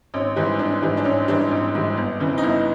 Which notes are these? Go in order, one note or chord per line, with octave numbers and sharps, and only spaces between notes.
G#1 C#4
G#2 E3 G3
G#1 D4
G#2 E3 G3
D4
G#1 C#4
G#2 E3 G3 D4
G#1
G#2 E3 G3
G1
F2 C#3 E3
D#4
G1 E4